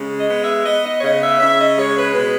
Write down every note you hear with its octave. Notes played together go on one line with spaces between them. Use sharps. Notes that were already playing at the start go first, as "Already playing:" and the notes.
Already playing: C#3 G#3
D#5
B3
E5
B3 D#5
D#5
C#5
C#3 D#5
E5
C#3 E5
D#5
G#3 C#5
B4
B2 B4